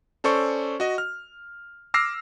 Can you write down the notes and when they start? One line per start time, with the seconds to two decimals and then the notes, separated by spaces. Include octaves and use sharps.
0.24 C#4 A4 C5 D5 C#6
0.80 F#4 D#5
0.98 F6
1.94 D6 E6 F6 A#6 C7